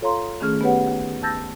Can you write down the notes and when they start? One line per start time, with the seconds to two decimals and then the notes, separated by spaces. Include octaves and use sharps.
0.01 F4 A4 C#5 F5 A#5 C6
0.40 D#3 A3 C#4 G#4 F6
0.61 B3 C#4 G4 B4 C#5 F#5
0.88 D#2
1.23 A5 E6 G6 A6 A#6